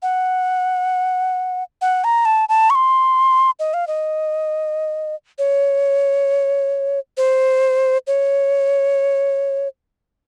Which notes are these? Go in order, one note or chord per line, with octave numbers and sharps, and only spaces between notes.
F#5
F#5
A#5
A5
A5
C#6
C6
D#5
F5
D#5
C#5
C5
C#5